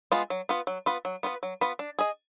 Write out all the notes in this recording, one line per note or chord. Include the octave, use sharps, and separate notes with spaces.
G#3 B3 F4
F#3
B3 F4 B4
F#3
B3 F4 B4
F#3
B3 F4 B4
F#3
B3 F4 B4
D4
G#4 D#5